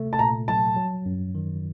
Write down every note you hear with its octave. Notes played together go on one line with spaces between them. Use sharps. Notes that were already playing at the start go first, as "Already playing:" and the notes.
Already playing: C3 A3
A5
A#2 A#5
F#3 A5
F#3
F#2
D#3